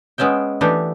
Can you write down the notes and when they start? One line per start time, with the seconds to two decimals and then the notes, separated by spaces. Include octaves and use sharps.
0.18 G#3 B3 C#4 E5 G5
0.61 E3 A3 B3 D4 G4